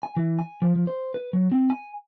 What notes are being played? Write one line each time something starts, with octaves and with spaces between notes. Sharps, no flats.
G#5
E3
G#5
F3
F3
C5
B4
F#3
C4
G#5